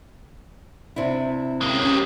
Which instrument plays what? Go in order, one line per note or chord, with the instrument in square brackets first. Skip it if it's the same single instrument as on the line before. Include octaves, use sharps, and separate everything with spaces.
[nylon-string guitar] C3 D4 E4
[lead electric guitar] G#3 A#3 [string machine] C#4 G4